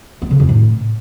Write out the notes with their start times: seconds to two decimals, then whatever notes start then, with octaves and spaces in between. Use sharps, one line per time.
0.22 B3
0.31 C#3
0.40 F2
0.49 A2